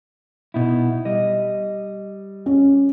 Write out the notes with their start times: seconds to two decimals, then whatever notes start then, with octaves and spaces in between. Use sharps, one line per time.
0.54 B2 D#4 E4
1.05 G3 D#5
2.46 C#4